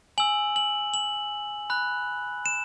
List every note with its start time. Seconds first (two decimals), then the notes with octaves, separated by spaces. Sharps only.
0.18 G#5 E6 F#7
0.56 F#7
0.94 F#7
1.70 B5 F#6
2.46 E7